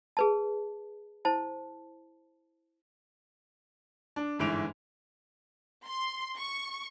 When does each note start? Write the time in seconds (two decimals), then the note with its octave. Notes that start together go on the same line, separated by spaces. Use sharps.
0.17 G#4 B4 A5
1.25 E4 C5 A5
4.16 D4
4.39 G1 G#2 E3 D7 F7
5.86 C6
6.38 C#6